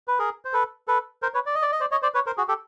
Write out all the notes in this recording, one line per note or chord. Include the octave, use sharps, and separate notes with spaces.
B4
G#4 A#4
C5
A4 B4
A4 B4
A#4 C5
B4 C#5
D5
D#5
D5
D#5
C5 D5
C#5 D#5
C5 D5
B4 C#5
A#4 C5
F#4 G#4
G4 A4